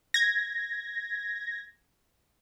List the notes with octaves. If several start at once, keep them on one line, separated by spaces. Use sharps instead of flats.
G#6 A#6